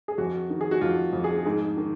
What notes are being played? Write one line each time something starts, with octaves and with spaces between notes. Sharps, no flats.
G#4
F2 F#4
D#3
G#4
F#4
F2 F4
F2
G#4
G#2 G#4
D#3